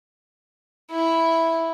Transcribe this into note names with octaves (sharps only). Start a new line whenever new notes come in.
E4